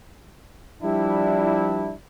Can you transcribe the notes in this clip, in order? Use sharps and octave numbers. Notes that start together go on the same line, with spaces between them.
F3 G3 D4 E4